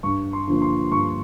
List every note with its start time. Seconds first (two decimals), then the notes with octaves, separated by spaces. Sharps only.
0.03 G2 C#6
0.33 C6
0.47 D3 F3 A#3
0.62 C6
0.92 G2 C#6